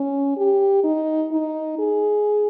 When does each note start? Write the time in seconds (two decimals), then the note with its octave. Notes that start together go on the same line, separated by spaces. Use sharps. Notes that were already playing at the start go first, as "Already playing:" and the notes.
Already playing: C#4
0.37 G4
0.84 D#4
1.32 D#4
1.79 G#4